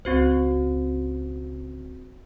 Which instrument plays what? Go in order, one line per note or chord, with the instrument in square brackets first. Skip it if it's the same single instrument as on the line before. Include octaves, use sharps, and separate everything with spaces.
[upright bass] C#2 [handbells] C4 F#4 C5